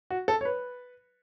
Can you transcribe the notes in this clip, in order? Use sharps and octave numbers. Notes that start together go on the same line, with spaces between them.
F#4
A4
C#5
B4